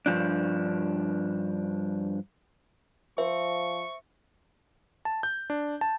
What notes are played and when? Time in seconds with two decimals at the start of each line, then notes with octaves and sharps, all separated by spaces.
0.06 G2 F3 D4
3.18 F3 C5 E5 C#6
5.05 A5
5.23 G6
5.50 D4
5.81 A5